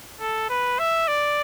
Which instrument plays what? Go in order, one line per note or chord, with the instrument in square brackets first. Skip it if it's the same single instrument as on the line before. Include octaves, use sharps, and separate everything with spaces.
[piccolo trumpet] A4
B4
E5
D5